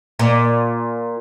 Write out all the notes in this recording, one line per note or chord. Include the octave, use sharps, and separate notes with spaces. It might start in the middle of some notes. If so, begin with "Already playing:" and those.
A#2